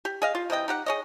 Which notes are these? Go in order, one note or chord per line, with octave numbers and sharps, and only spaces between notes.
G4
G#4 D#5 F5
F4
C3 E3 D#5 G5
D#4 G4 F#5
G#4 C#5 D#5